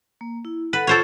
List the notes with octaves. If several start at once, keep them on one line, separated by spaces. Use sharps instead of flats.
A#3
E4
A4 B4 F#5
F4 A4 C5 C#5